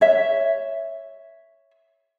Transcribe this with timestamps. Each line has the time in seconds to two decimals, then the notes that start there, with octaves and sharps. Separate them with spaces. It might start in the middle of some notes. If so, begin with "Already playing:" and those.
0.01 C#5 E5